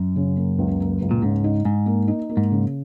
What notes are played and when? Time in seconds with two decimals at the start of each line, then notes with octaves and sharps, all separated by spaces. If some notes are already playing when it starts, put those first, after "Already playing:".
Already playing: F#2
0.16 C#3
0.36 A#3
0.59 C#2
0.80 A#3
1.01 C#2
1.11 A#2
1.22 G#2 C#3
1.44 D#4
1.65 G#2 D#4
1.86 A#3
2.08 D#4
2.29 A#3
2.37 G#2
2.51 C#3